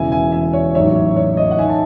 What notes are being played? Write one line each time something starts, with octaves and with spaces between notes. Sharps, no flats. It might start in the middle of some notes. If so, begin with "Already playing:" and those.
Already playing: E1 E2 C#3 E3 E5 G#5
E5 G#5
E5 G#5
C#5
A1 G#2 D#3 F#3 C#5 E5
C#5
C#5
D#5
F#5
D#3 E5 G#5
A5